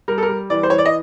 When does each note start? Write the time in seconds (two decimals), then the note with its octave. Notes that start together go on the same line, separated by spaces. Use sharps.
0.08 G3 A#4
0.18 A4
0.23 A#4
0.29 G3
0.50 E3 D5
0.63 C5
0.70 E3 C#5
0.78 D5
0.86 D#5